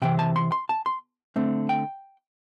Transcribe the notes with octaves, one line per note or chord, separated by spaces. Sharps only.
C3 E3 C4 G5
A5
C6
C6
A5
C6
D3 A3 C4
G5